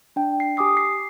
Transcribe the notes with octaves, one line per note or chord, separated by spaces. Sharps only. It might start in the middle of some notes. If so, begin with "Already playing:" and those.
D4 G5
C7
G4 G#5 D6 D#6 C7
C7